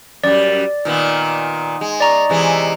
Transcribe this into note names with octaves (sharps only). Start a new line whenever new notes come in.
F#2 G3 D5
A#2 D#3 B3
G#3
D5 A#5 C#6
C3 E3 G#3